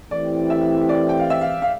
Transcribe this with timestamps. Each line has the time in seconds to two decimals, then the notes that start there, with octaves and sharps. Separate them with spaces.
0.11 E3 A3 C4 E4 G4 D5
0.50 E5
0.89 D5
1.09 G5
1.20 F5
1.30 E5
1.41 F5
1.62 F5